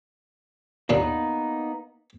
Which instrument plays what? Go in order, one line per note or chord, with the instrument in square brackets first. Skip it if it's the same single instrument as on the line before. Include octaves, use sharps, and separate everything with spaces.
[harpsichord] D#2 A#2 D4 [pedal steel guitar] A#3 B3 D#4